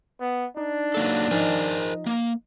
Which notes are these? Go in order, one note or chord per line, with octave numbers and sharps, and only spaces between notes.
B3
D4 D#4
F#3 A#3 A4
F3 D#4 A#4 C5 D#5 G#5
A#3